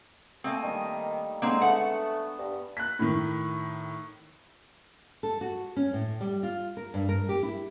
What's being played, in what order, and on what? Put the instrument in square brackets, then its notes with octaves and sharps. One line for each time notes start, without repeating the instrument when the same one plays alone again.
[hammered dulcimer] A3 A#3 D#5 [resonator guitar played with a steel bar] C4 G#5
[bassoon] D#3 [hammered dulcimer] G3 D#4
[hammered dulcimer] D3 G#3 [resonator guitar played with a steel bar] A#3 C4 [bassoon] D#4
[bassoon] A3 [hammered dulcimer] B3 D4 C#6 [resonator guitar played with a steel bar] F#5
[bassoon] G2
[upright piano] F#6 B6
A2 D#3
[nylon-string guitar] A4
F#4
C#4
A2
G3
F4
A#4
G2
A#4
G4
E4